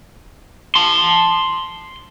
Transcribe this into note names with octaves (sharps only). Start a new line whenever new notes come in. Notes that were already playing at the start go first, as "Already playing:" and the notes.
A5 C6